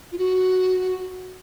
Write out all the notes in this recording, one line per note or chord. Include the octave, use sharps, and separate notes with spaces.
F4
F#4